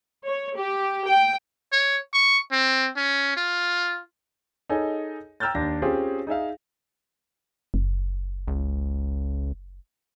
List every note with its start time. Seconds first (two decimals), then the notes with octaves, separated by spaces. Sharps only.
0.26 C#5
0.57 G4
1.07 G5
1.73 C#5
2.14 C#6
2.52 C4
2.97 C#4
3.37 F4
4.69 D#4 G#4 A4 C#5 D#5 G#5
5.40 G5 A#5 E6 F6 G6 A6
5.55 D#2 D4 A#6
5.82 C4 C#4 F4 G4 G#4 C5
6.27 D#4 G#4 E5 F5
7.74 F#1
8.48 C#2